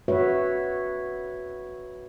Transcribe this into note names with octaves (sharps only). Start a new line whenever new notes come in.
F#4 B4 C#5 E5